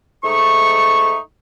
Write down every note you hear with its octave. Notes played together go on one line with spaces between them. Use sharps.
G#2 A3 D#4 E5 C#6